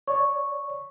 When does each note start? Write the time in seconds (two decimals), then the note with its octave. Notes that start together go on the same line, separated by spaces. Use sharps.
0.08 C#5 D5 C#6